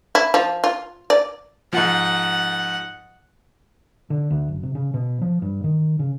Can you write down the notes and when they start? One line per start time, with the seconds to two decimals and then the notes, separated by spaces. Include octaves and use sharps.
0.15 E4
0.34 F3
0.64 F4
1.10 D5
1.73 G#2 F3 F#5
4.10 D3
4.30 D2
4.48 F#1
4.63 C3
4.75 C#3
4.94 B2
5.21 F3
5.42 G2
5.64 D#3
5.99 C#3